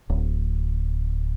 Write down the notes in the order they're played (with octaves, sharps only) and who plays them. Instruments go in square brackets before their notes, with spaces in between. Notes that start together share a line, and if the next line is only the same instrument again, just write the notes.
[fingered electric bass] D1